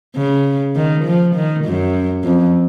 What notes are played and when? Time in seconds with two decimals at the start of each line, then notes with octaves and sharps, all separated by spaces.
0.16 C#3
0.75 D#3
1.05 F3
1.35 D#3
1.65 F#2
2.24 F2